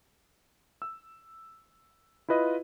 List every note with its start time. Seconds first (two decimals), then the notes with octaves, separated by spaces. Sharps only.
0.82 E6
2.28 E4 F4 B4 D#5